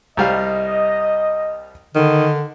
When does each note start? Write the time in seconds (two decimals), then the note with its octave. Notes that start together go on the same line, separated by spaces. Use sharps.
0.17 C2 G3 D#5 F5
1.95 D3 D#3